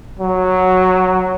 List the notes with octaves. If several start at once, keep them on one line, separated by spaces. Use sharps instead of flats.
F#3